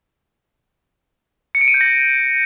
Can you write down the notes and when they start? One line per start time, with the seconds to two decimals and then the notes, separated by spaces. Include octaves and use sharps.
1.55 C#7
1.61 D7
1.68 D#7
1.74 G6
1.81 A#6